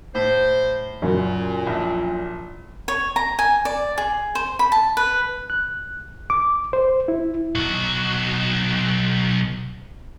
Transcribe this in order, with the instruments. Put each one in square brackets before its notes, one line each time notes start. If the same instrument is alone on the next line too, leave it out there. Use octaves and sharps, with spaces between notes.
[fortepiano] A2 [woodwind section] C5
[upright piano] F#2 [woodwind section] A#2 [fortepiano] C#3
[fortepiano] A#1 E4
[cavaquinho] C#5
A#5
G#5
D5
G#4
C5
B5
A5
B4
[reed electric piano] F#6
D6
C5
E4
[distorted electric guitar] B1 F#4